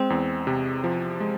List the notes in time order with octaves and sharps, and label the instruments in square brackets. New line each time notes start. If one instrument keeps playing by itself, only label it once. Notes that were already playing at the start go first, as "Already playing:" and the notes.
Already playing: [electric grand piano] G#3 [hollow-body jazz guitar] C4
[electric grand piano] E2
C3
F3
G#3